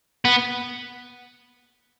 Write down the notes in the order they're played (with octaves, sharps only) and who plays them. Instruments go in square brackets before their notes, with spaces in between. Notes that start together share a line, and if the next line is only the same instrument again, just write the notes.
[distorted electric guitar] B3